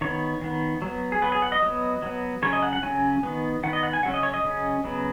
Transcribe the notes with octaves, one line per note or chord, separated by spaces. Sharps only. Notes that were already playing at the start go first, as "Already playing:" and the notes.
D#3 B3 C#5
D#3 B3
F#3 B3
G#4
F#3 B3 B4
G#4
F#5
D#5
F#3 B3
F#3 B3
C#3 F#3 C#4 C#5
D#5
F#5
F#5
C#3 F#3 C#4 G#5
D#3 B3
D#3 B3 F#5
D#5
F#5
G#5
C#3 F#3 C#4 F#5
D#5
C#5
D#5
C#3 F#3 C#4
C#3 F#3 B3